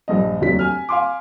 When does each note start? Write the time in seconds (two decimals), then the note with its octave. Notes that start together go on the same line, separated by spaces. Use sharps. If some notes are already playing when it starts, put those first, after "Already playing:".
0.08 A#1 G2 D#5
0.41 F1 D#2 F#3 D4 B6
0.59 G#5 F6
0.89 F5 G#5 C6 D6